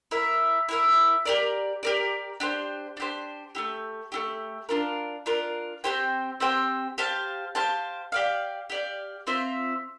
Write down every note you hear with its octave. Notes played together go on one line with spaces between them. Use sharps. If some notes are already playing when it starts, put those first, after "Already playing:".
E4 A#4 E5
E4 A#4 E5
G4 A#4 D5
G4 A#4 D5
D4 G4 C5
D4 G4 C5
A3 E4 G4
A3 E4 G4
D4 F4 A#4
D4 F4 A#4
C4 G4 C5 G5
C4 G4 C5 G5
G4 C5 F5 A5
G4 C5 F5 A5
G4 D5 F5
G4 D5 F5
C4 F4 C5 E5